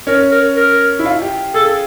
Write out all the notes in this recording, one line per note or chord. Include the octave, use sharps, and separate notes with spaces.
C#4 A#4
A#4
A#4
E4
F4
G4
G#4 A4